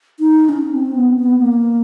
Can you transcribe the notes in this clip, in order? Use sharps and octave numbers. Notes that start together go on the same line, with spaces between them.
D#4
C#4
C4
B3
B3
A#3